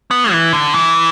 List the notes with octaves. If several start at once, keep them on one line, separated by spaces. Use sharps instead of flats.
B3
E3
D3
E3